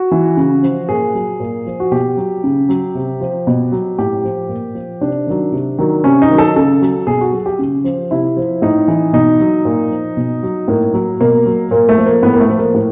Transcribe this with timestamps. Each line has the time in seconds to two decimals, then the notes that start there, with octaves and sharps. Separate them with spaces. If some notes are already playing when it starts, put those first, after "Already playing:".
Already playing: F#4
0.11 E3
0.37 C#3
0.63 F3
0.89 A#2 G#4
1.14 F#3
1.40 A#2
1.66 F3
1.80 F#4
1.91 B2 G4
2.17 F#3
2.44 C#3
2.69 F#3
2.95 C3
3.21 F3
3.47 B2
3.72 F#3
3.99 A2 G4
4.24 F3
4.49 A#2
4.75 F3
5.01 C3 D4
5.27 D#3 F#3
5.52 C3
5.79 D#3 F#3
6.04 C3 C#4
6.22 D#4
6.30 D#3 F#3
6.38 A4
6.56 C#3 A4
6.82 F#3
7.07 B2 G#4
7.21 F#4
7.33 F#3 G#4
7.46 G4
7.59 C#3
7.84 F3
8.11 C3 E4
8.37 F3
8.62 A2 D#4
8.88 E3
9.13 B2 D#4
9.40 F#3
9.65 A#2
9.91 F3
10.17 B2
10.43 F#3
10.68 A2 A#3
10.94 F#3
11.21 B2 A#3
11.46 F#3
11.71 A#2 A#3
11.89 A3
11.98 F3
12.06 A#3
12.23 A2 B3
12.34 A#3
12.41 A3
12.49 F3
12.58 A#3
12.74 A2